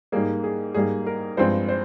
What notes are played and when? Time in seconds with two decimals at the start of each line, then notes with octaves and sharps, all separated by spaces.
0.12 G#2 G3 A#3 G#4
0.44 G#4
0.74 G#2 G3 A#3 G#4
1.06 A#4
1.37 G2 F3 G#3 C4 C5
1.69 C5